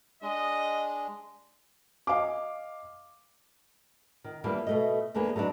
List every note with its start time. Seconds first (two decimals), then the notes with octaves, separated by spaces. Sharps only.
0.22 G#3 D4 D#5
2.07 D#5 F5 G#5 D6
4.24 D#3
4.44 E3 G3 A#3 B3 D4
4.67 B2 A3 D#5
5.14 E2 D3 A#3 B3 G#4 B4
5.36 F#3 G3 B3 D4 D#4